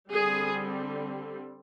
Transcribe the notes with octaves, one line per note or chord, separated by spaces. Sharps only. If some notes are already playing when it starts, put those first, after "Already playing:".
D3 G3 C4 G#4